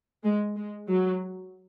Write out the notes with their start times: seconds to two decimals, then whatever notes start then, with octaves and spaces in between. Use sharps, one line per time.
0.24 G#3
0.56 G#3
0.89 F#3